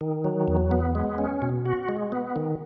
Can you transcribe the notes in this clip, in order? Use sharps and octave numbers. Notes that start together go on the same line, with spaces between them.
D#3
F#3
E2
B3
G#3
C#4
B2
F#4
G#3
B3
D#3